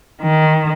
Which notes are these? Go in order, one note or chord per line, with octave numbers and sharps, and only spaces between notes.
D#3